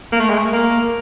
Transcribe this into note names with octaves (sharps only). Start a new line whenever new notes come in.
A#3
A3
G#3
A3
A#3